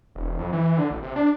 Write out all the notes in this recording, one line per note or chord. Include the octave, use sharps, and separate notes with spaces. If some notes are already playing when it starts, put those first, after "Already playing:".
E1
F2
E3
D3
A1
C3
D4